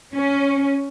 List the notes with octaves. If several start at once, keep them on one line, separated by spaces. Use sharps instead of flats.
C#4